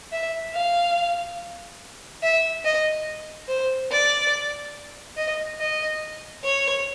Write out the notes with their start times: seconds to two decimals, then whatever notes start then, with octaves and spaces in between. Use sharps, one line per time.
0.12 E5
0.54 F5
2.23 E5
2.65 D#5
3.48 C5
3.91 D5
5.17 D#5
5.60 D#5
6.44 C#5